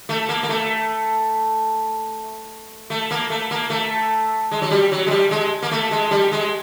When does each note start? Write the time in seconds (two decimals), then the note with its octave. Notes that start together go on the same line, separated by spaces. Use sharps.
0.09 A3
0.29 A#3
0.43 A#3
0.49 A3
2.90 A3
3.11 A#3
3.30 A3
3.51 A#3
3.70 A3
4.51 G#3
4.62 F#3
4.71 G3
4.92 F#3
5.06 G#3
5.10 G3
5.31 G#3
5.62 A#3
5.71 A3
5.91 G#3
6.11 G3
6.32 G#3